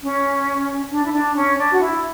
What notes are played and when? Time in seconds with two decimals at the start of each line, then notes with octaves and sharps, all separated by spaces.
0.01 C#4
0.90 D4
1.05 E4
1.12 D4
1.35 C#4
1.57 D4
1.72 F#4
1.80 E4